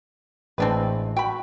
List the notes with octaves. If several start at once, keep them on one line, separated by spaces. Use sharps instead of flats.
A1 G#3 C4 D4 B4
F#4 G5 B5